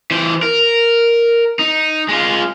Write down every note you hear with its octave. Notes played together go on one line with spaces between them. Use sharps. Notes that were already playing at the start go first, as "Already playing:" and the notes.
E3 C5
A#4
D#4
G#3 F4